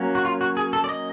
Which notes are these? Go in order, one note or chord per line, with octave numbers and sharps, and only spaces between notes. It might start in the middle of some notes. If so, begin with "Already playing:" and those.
Already playing: F#3 A#3 C#4
F#4
F4
F#4
G#4
A4
D5
D#5